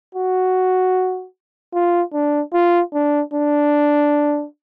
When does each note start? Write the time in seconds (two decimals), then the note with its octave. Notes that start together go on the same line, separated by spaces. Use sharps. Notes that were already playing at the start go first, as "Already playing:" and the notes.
0.15 F#4
1.74 F4
2.13 D4
2.53 F4
2.93 D4
3.33 D4